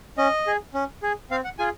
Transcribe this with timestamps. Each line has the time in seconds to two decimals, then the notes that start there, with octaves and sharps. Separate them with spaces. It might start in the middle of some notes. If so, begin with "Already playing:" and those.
0.18 C#4 D#5
0.47 G#4
0.74 C#4
1.02 G#4
1.31 C4 F5
1.44 F#5
1.59 F4 G#4 G#5